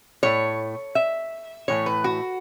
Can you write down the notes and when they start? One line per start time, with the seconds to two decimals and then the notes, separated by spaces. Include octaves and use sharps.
0.23 A2 A3 C#5
0.95 E5
1.68 A2 E3 A3 C#5
1.86 B4
2.04 F#4